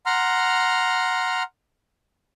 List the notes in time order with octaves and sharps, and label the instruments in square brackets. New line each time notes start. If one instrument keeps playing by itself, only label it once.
[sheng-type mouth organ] F#5 A#5 C6 F6